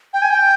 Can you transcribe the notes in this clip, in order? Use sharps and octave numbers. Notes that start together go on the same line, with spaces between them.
G5
G#5
G5